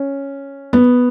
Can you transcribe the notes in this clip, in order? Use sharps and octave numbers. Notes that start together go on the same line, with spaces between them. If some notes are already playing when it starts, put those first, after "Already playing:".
Already playing: C#4
B3